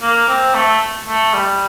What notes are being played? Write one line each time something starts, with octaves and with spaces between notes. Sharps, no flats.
A#3
C4
A3
A3
G3